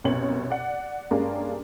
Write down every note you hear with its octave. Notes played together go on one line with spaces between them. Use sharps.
C2 F#2 B2 C#5 F#7
D5 F#5
G2 G3 G#3 A#3 C#4 D4